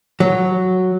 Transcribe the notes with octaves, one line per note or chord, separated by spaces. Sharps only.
F#3